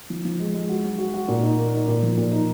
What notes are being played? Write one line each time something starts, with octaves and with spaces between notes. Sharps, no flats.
F3
F3
G#3
G#3
F#4
F#3
F#4
F#4
A#2
D#4
A#3
D#4
A#2
F3
A#2
D#4